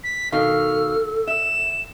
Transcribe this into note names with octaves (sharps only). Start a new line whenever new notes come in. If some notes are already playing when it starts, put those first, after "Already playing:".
B6
B2 D#3 A4 F5 F6
E5 E7